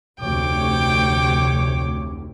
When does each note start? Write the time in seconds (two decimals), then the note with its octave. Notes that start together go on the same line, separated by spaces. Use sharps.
0.20 F1 D2 C3 C#5 G5 D6